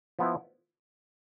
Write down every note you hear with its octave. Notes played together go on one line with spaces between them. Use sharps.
F3 B3 E4